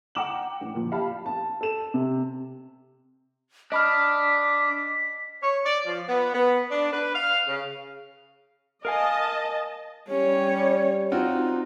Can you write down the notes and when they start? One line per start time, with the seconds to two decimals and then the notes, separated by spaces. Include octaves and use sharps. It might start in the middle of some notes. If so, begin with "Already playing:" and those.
0.15 F#5 G5 A#5 D6 E7 F#7
0.61 A1
0.74 A#2 F3
0.92 G4 F5 A5 B5
1.26 A5
1.61 A4 E7
1.94 C3
3.72 D4 D#5 B5 F6 B6
5.42 C#5
5.66 D5
5.86 F3
6.08 B3
6.34 B3
6.71 D4
6.92 B4
7.15 F5
7.47 C#3
8.85 A#4 D#5 F5 G#5 A5
10.08 G3 C#4 C#5
11.12 C4 D#4 F4 F#4